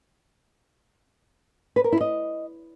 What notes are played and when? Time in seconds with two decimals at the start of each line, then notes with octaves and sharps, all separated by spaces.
1.76 B4
1.84 A#4
1.92 E4
2.01 D#5